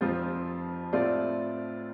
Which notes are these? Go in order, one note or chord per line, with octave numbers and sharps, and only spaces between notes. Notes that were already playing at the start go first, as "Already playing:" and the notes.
F1 F2 F3 C4 F4
A2 A3 C4 F4 D5